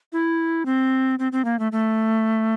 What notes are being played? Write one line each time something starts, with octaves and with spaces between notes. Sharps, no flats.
E4
C4
C4
C4
A#3
A3
A3